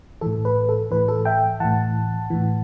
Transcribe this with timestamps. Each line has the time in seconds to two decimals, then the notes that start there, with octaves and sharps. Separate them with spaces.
0.21 A2 E3 A4
0.45 B4
0.69 A4
0.91 A2 E3 B4
1.08 A4
1.25 E5 G5
1.60 A2 E3 F#5 A5
2.30 A2 E3